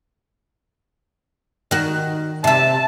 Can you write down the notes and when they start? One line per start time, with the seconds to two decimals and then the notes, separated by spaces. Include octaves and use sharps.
1.71 D#3 F#4
2.44 C3 E5 A5